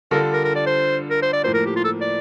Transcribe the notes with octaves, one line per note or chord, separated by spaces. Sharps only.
D3 G3 D4 F4 A4 A#4
A#4
A#4
D5
C5
A#4
C5
D5
A2 F3 A#3 C5
A#4
G4
F4
A4
D5